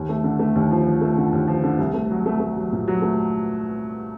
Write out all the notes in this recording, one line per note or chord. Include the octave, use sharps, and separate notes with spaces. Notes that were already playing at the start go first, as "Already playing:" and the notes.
Already playing: D#2
A3
D3
A3
D#2
F3
F3
A3
D3
D#2
F3
D3
C2
A3
F#3
A3
A3
F#3
A#2
F#3
A3